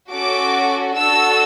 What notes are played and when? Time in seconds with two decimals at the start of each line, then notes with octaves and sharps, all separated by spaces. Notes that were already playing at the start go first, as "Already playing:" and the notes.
0.12 C#4 F#4 A4 D6
0.96 D4 F#4 A4 E6